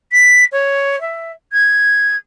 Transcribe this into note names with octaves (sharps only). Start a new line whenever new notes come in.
B6
C#5
E5
G#6